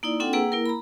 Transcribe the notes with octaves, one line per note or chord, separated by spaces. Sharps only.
A#3 D#4 E4 D5
C4 D4 F4 A4 F#5 G5
A#3 G#4 B4 F#5 G5 E6
A#3 E4 A#4
A#5 B5